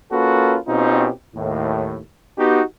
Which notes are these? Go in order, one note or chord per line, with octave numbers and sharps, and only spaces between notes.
A#3 C#4 F4 F#4 A4 B4
B2 C4 C#4 D#4 F4 G4
D#2 A2
B3 D#4 F#4 G4